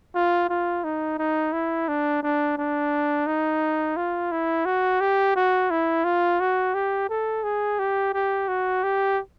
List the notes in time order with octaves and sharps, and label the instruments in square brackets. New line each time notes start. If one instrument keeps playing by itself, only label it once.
[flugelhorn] F4
F4
D#4
D#4
E4
D4
D4
D4
D#4
F4
E4
F#4
G4
F#4
E4
F4
F#4
G4
A4
G#4
G4
G4
F#4
G4